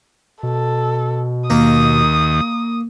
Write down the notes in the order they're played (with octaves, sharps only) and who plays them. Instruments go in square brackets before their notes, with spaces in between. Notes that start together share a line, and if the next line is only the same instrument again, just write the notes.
[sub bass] B2 [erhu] A4
[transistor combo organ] D#2 [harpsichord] A#3 [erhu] D#6